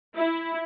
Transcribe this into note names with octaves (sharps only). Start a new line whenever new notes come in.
E4